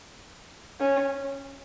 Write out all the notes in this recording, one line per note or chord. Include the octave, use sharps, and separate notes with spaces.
C#4